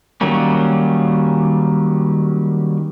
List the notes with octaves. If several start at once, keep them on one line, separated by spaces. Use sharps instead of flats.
D#3 F#3 G3 A#3 C#4